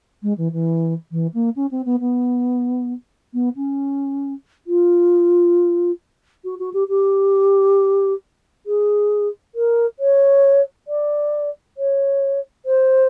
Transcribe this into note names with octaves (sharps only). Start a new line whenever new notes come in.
G#3
E3
E3
E3
A#3
C#4
C4
B3
B3
B3
C#4
F4
F#4
F#4
G4
G4
G#4
A#4
C#5
D5
C#5
C5